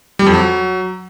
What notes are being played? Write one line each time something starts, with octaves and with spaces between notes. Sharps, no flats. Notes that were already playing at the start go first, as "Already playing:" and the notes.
G3
F2
F#3